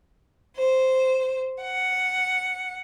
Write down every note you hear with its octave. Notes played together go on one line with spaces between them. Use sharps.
C5
F#5